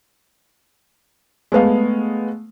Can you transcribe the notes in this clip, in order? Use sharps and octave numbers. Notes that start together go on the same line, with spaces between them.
G#3 A3 B3 F5